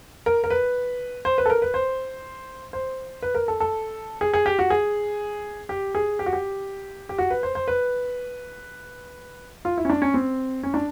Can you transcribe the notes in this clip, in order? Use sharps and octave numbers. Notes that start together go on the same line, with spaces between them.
A#4
A#4
B4
C5
B4
A4
A#4
B4
C5
C5
B4
A#4
A4
A4
G#4
G#4
G4
F#4
G#4
G4
G#4
G4
F#4
G4
G4
F#4
B4
C5
C5
B4
F4
E4
C#4
D4
C#4
C4
C#4
D4